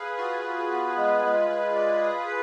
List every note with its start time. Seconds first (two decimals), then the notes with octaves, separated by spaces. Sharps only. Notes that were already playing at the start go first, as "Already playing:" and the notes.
Already playing: G#4 B4 F5
0.18 F4 F#4 G#4
0.45 F#4
0.70 B3
0.97 G#3
1.23 G#3
1.48 G#3
1.75 D5
2.01 G#4
2.26 B4